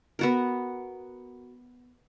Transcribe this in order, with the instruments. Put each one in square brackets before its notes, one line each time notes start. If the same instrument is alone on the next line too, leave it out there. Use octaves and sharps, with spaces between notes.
[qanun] B3 F#4 A#4